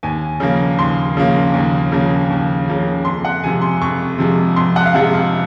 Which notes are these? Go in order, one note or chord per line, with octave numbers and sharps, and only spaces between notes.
D#2 G#5
C#3 F3 A#3
D#2 C6
C#3 F3 A#3
D#2
C#3 F3 A#3
D#2
C#3 F3 A#3
F2 C6
F#5
C3 F3 G#3 G#5
C6
F2 C#6
C3 F3 G#3
F2 C6
F#5
F5
C3 F3 G#3 F#5
F5